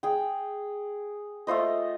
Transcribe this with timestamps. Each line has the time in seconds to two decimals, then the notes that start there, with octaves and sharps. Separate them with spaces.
0.03 G#4 G5
1.47 A3 F4 C5 D#5